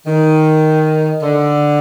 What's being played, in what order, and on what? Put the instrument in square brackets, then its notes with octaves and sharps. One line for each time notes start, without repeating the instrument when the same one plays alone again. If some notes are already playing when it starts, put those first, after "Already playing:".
[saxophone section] D#3
D3